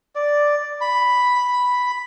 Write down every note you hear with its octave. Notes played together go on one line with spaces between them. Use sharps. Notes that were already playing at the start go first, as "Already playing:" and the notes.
D5
B5